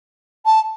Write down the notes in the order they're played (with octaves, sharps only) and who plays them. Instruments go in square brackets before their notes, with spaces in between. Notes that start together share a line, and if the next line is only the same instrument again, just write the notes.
[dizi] A5